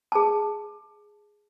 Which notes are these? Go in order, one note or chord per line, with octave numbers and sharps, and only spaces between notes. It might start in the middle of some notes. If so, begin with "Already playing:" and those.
G#4 A5